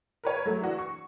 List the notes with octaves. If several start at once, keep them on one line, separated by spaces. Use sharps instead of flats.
A#4 B4 C#5
F#3 A3
E3 D4 F#4
C#6